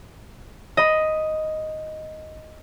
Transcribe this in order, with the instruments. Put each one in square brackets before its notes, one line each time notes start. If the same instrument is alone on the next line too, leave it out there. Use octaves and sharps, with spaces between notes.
[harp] D#5 B5